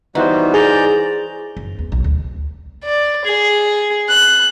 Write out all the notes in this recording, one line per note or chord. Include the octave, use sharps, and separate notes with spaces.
E3 G3 B3 D#4 F#4 C5
G#4 D5 A#5 G6
F#2
E2
B1
D2
D5
G#4
F#6